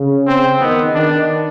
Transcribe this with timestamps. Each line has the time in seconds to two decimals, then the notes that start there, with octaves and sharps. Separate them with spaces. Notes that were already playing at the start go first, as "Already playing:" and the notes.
Already playing: C#3
0.27 C4
0.61 D#3 B3
0.95 D#3 D4